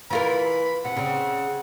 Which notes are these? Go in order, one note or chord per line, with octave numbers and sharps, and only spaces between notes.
E3 F4 A#4 B5
C3 F#5
C#3 C4